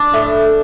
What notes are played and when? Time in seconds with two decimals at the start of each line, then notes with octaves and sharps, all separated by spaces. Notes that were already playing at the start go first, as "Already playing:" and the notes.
Already playing: D4
0.14 A2